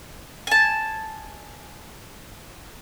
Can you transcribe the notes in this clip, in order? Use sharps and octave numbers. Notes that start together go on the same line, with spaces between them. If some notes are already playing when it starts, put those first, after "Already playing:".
G#5 A5